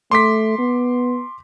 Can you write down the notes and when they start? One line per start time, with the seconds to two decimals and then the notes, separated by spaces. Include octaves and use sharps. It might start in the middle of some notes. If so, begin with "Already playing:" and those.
0.11 A3 C6 D6 B6
0.59 B3